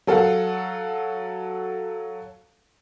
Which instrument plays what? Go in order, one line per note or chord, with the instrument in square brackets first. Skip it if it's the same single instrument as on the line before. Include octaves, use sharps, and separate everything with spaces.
[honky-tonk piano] F#3 A4 F5 F#5